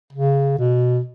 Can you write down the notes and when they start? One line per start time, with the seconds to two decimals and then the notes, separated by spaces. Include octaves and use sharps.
0.13 C#3
0.59 B2